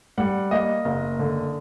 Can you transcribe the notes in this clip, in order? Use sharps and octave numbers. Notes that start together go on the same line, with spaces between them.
G3 F#5
A#3 D#5
F#1
D3